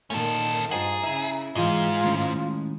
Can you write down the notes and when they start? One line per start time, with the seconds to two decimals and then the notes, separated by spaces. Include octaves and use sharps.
0.10 A#2 D#3 C#4 A4
0.71 G2 F4 G#4 C5 D#5 F#5 A#5
1.03 C#3 E4 E5
1.55 G#2 E3 G#3 F4 G#4 D#5
2.04 A2 D#3 C#4